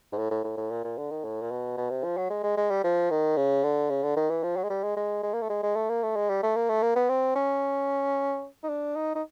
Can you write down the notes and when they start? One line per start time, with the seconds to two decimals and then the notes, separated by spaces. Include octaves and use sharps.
0.12 G#2
0.18 A2
0.31 A2
0.44 A2
0.57 A2
0.71 A#2
0.84 A#2
0.98 D3
1.11 D#3
1.24 A2
1.42 A#2
1.51 B2
1.77 B2
1.90 C3
2.04 F3
2.17 F#3
2.30 G#3
2.44 G#3
2.57 G#3
2.71 G3
2.84 F3
3.11 D#3
3.37 C#3
3.64 D3
3.90 C#3
4.03 D3
4.17 D#3
4.30 E3
4.43 F3
4.57 F#3
4.63 G#3
4.70 G3
4.83 G#3
4.97 G#3
5.23 G#3
5.34 A#3
5.42 A3
5.49 G#3
5.63 G#3
5.76 A3
5.89 A#3
6.03 A3
6.16 G#3
6.29 G3
6.43 A3
6.56 A#3
6.69 A3
6.82 A#3
6.96 B3
7.10 C4
7.35 C#4
8.63 D#4
8.69 D4
8.96 D#4
9.15 D#4